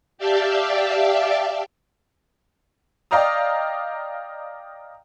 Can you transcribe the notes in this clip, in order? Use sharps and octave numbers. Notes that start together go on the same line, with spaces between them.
G4 D5 E5 F5 G5 A5
D5 D#5 F5 G5 A#5 D#6